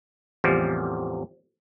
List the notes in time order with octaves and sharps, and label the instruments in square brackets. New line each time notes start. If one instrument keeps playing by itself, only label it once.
[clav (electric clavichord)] A1 E2 C3 F3 G3